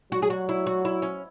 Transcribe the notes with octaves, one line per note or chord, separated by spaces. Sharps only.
F#3 F#4
G#4
F#4
E4
F#4
E4
C#4